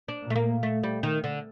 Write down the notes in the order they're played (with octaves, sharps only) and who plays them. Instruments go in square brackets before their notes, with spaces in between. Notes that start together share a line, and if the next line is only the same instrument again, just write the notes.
[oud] D4
[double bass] A#2
[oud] A3
A#3
A3
G3
D#3
D3